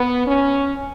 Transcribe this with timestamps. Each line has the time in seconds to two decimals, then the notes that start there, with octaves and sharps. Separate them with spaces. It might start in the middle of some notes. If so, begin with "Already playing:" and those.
Already playing: B3
0.26 C#4